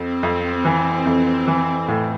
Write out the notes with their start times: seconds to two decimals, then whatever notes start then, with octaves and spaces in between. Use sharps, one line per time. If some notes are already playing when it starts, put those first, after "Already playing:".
Already playing: F2 C4
0.23 F2
0.65 E3
1.06 F2
1.48 E3
1.88 A2